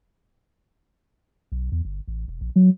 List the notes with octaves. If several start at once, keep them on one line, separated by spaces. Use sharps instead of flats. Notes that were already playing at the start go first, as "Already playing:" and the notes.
B1
E2
G1
A1
E1
A#1
F#3